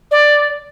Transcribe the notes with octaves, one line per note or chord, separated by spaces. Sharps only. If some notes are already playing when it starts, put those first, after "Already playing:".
D5